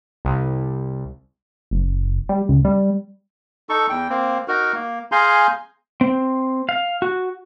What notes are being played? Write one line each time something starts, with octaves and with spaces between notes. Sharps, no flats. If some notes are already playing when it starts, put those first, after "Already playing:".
C2
F#1
G3
C#2
G3
D#4 A4 C#6
E2 G5
A#3 C4
D#4 F#4 A#4
A#3
G#4 F5 G#5 A#5 C6 G6
C4
F5
F#4